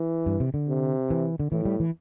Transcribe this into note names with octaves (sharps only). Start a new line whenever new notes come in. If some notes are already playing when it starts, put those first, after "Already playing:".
Already playing: E3
G2
C3
D3
C3
E3
D3
A2 E3
G3
E3